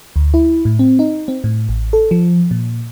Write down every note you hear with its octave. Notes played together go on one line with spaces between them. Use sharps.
D2
E4
A2
C4
D#4
C4
A2
A1
A4
F3
A#2